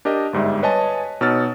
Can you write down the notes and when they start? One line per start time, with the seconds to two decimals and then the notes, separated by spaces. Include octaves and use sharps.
0.05 D4 G4 A#4 D#5
0.33 G1 G#2 G3 E5
0.63 B4 C#5 D#5 G#5 A5
1.21 B2 D#4 C#5 E6 F6 A6